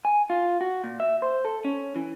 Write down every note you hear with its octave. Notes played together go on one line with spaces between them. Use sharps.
G#5
F4
F#4
A#2
E5
C5
A4
C#4
E3